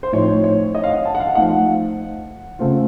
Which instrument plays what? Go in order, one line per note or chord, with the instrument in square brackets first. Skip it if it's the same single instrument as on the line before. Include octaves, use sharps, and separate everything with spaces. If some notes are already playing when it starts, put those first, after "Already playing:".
[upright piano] C5
[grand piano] A2 F3 C4 D#4 [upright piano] C#5
[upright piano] C#5
D#5
F5
F#5
A5
F#5
F5
[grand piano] F3 A3 D#4 [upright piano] F#5
[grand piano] C#3 A3 C4 F4